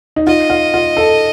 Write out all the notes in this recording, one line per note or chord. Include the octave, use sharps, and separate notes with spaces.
D#4
F4 D#5
F4
F4
A4